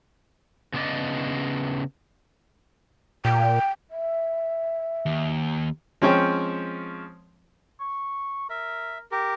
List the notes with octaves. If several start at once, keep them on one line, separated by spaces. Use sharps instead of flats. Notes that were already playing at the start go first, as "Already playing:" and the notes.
C#3 B3 D4 D#4 D5 D#5
A#2 G5
E5
D#2
F3 G#3 C4 C#4 C#5 G5
C#6
A#4 E5
G4 A#4